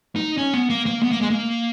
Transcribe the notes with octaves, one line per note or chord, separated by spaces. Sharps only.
D#4
C#4
B3
A#3
A#3
B3
A#3
G#3
A#3